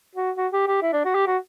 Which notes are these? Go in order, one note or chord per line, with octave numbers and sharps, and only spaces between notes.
F#4
F#4
G4
G4
E4
D4
F#4
G4
F#4